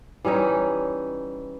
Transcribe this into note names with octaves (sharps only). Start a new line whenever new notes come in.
E3 G3 C#4 D#4